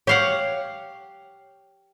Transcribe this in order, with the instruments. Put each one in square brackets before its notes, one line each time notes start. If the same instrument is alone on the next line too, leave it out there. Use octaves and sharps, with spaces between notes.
[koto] G4 F5 F#5 [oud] C#5